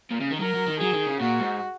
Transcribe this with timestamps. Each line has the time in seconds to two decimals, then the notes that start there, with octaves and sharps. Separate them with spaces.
0.11 A#2
0.21 C#3
0.31 D#3
0.40 F#3 A#4
0.54 F#3
0.67 D#3
0.80 F#3 G#4
0.93 D#3
1.07 C#3
1.20 A#2 F#4
1.40 G#2